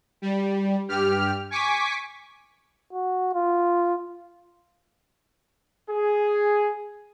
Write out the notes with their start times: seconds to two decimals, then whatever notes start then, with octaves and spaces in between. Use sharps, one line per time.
0.22 G3
0.88 G2 G4 F6
1.50 G#5 C#6 D6 B6
2.93 F#4
3.34 F4
5.90 G#4